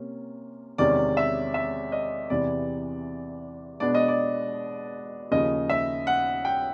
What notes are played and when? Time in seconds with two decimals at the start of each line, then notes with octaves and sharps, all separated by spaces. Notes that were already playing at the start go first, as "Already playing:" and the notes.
Already playing: C3 A#3 C#4
0.78 E2 C3 D#3 G#3 C#4 D5
1.17 E5
1.54 E5
1.92 D#5
2.30 E2 C3 E3 D5
3.80 B2 G#3 B3 D4 D5
3.95 D#5
4.08 D5
5.31 D#2 C#3 F3 D#5
5.69 E5
6.07 F#5
6.45 G5